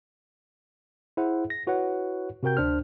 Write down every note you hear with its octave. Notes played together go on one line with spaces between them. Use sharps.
E4 G#4 C5 F#5
A#6
E4 F#4 B4 C#5 F#5
C3 F#4 A#4 G5 G6
D2 D4 C5 F6